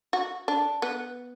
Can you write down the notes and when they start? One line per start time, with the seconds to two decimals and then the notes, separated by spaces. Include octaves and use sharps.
0.13 F#4
0.48 D4
0.82 B3